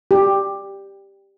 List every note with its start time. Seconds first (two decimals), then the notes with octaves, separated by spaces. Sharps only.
0.11 G4